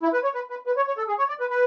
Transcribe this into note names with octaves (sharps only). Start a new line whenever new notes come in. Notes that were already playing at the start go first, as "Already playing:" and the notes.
E4
B4
C#5
B4
B4
B4
C#5
C#5
A4
G#4
C#5
D5
B4
B4